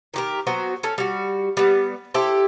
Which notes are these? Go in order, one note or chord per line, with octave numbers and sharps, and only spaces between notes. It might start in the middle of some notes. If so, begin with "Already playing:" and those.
D#3 G4 A#4
F#3 B3 F#4 C5
C#4 A4
G3 F#4
G3 B3
E4 G4 A4 C5